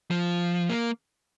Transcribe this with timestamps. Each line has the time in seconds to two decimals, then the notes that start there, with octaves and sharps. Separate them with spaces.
0.11 F3
0.70 A#3